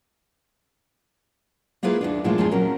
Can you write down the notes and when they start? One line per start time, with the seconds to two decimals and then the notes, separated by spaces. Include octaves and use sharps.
1.83 A#3 E4 F4 G#4 B4
2.01 D#2 D#3 D4
2.24 A#2 F3 G#3 A3 E4 F4
2.38 E2 F3 C4 D4 G#4
2.51 A#2 F#3 C#4 A#4